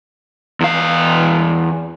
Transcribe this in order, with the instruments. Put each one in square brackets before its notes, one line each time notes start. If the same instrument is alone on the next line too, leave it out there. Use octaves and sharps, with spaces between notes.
[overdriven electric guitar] E2 F5